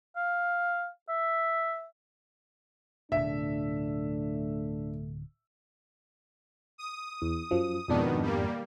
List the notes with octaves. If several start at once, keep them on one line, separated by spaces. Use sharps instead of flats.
F5
E5
D1 B2 A3 D4 E5
D#6
E2
F#2 F3
F2 G#2 B2 D#3 B3 D4
G3 A#3